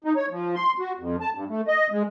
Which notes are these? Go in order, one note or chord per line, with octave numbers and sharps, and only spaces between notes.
D#4
C#5
F3
C6
F#4
F2
A5
G2
A3
D#5
G#3